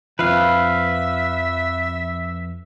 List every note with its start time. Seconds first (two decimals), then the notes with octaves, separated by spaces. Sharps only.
0.19 F2 F3 B4 E5 F5